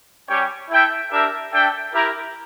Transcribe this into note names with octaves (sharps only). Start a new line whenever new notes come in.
G3 C#4 G4 C#5 G5
E4 A4 E5 G5
D4 G4 A#4 E5
D4 A4 E5 G5
E4 G4 A#4